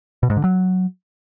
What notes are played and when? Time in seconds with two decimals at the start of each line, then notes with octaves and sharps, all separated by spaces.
0.23 B2
0.30 G#2
0.37 D3
0.44 F#3